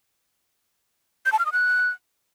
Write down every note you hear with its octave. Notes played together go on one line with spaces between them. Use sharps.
G6
A5
F6
D#6
F#6